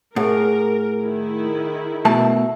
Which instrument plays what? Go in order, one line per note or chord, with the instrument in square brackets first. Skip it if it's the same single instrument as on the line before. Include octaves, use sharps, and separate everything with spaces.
[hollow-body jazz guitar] A2 [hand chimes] G#4 F#5 [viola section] A#4
[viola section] D#3 E4
[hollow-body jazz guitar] B2 A3 A5 [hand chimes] E5